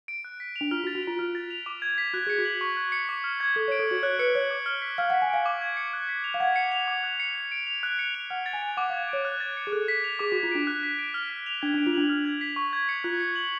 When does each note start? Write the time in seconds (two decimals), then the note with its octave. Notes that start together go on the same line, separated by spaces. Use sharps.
0.08 D7
0.24 F#6
0.40 B6
0.56 F7
0.61 D4
0.71 F4 F6
0.84 F#4
0.87 A6
0.95 F#4
1.03 F4 F7
1.19 F4 F6
1.35 A6
1.50 F7
1.66 D6
1.82 G#6
1.98 B6
2.13 F#4 F#6
2.27 G#4 C#7
2.38 F#4
2.45 F#7
2.61 C#6
2.77 F#6
2.92 C#7
3.09 D6
3.24 F6
3.40 G#6
3.56 A4 G#6
3.68 C#5
3.72 D7
3.79 A4
3.88 F#4 F#7
4.03 C#5 F#6
4.19 B4 C#7
4.35 C#5 F#7
4.51 D6
4.66 F6
4.82 B6
4.98 F5 F6
5.10 F#5
5.14 B6
5.22 G#5
5.30 F5 D7
5.46 D6
5.61 G#6
5.77 C#7
5.93 F#6
6.09 B6
6.24 F7
6.34 F5
6.40 F#5 G#6
6.56 C#7
6.72 F7
6.88 D6
7.03 F#6
7.20 C#7
7.35 G#6
7.52 D7
7.67 F7
7.83 F#6
7.99 C#7
8.15 F7
8.30 F#5 F6
8.46 A6
8.53 G#5
8.62 D7
8.77 F#5 D6
8.90 F5
8.93 G#6
9.09 C#5 D7
9.25 F#6
9.40 A6
9.57 C#7
9.67 G#4
9.72 A4 F#6
9.88 B6
10.04 F7
10.19 G#4 D6
10.32 F#4
10.36 G#6
10.43 F4
10.52 D4 D7
10.67 F#6
10.83 B6
10.98 D7
11.14 F6
11.30 B6
11.46 F7
11.62 D4 G#6
11.74 D4
11.78 D7
11.86 F4
11.93 D4 F#7
12.10 F6
12.25 G#6
12.41 B6
12.56 C#6
12.73 G#6
12.89 C#7
13.04 F4 F#6
13.20 C#7
13.36 F#7